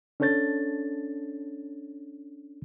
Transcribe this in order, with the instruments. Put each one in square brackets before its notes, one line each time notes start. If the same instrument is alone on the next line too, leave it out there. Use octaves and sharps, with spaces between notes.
[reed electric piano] C#4 D4 A4 C#5 G6 A6